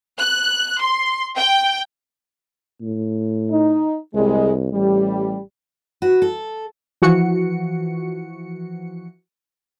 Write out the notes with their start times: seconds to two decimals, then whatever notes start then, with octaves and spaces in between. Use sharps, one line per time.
0.19 F#6
0.80 C6
1.37 G5
2.82 A2
3.50 D#4
4.14 C2 G3 G#3
4.73 A1 G3
6.02 F#4 B4
6.22 A4
7.02 E3 F3 F#4 C#7